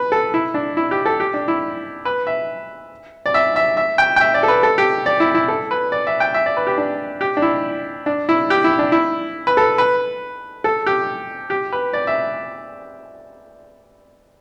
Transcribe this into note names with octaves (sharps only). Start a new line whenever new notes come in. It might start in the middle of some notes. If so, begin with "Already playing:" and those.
Already playing: B4
A4
E4
D4
E4
G4
A4
G4
D4
E4
B4
E5
D5
E5
E5
E5
G5
G5
E5
D5
A4
B4
A4
G4
D5
E4
E4
A4
B4
D5
E5
G5
E5
D5
B4
G4
D4
G4
D4
E4
D4
E4
G4
E4
D4
E4
B4
A4
B4
A4
G4
G4
B4
D5
E5